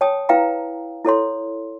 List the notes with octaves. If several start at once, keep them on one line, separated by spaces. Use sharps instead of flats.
C#5 G5 A5 D#6
E4 B4 F5 G5 A#5
E4 A4 C#5 C6